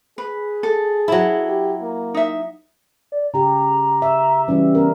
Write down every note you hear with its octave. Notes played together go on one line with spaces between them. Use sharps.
G#4 B4
A4
F#3 E4
G4
A#3
D#4 E5
D5
C#3 G4 A#5
E5
E3 G3 C#4 F#4
B3 A#4